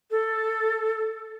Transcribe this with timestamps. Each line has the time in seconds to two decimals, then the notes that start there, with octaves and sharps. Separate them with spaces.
0.11 A4